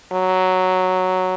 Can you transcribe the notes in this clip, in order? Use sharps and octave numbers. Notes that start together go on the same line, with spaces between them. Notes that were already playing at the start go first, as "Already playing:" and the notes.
F#3